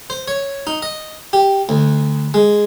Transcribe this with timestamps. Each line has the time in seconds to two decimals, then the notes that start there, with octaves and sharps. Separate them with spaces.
0.10 C5
0.28 C#5
0.67 D#4
0.82 D#5
1.33 G4
1.69 D2
2.34 G#3